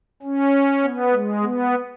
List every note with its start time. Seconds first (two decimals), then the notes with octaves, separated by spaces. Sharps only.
0.23 C#4
0.83 B3
1.13 G#3
1.43 B3